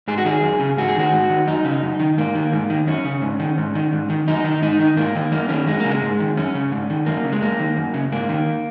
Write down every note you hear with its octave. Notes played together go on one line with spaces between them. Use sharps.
G#2 G#4
F#4
D#3 G#4
F#2
C#3
G#2 F#4
G#4
D#3 F#4
G#2
D#3
F#2 D#4
C#3
F#2
D#3
G#2 A#3
D#3
G#2
D#3
F#2 C#4
C#3
G#2
D#3
G#2
D#3
G#2
D#3
F#2 D#4
D#3
G#2 D#4
D#3
G#2 A#3
D#3
F#2 A#3
D#3 C#4
F#2 G#3
C#3 A#3
G#3
G#2
D#3
F#2 C#4
C#3
G#2
D#3
F#2 A#3
C#3
G#3
F#2 A#3
D#3
F#2
C#3
G#2 A#3
D#3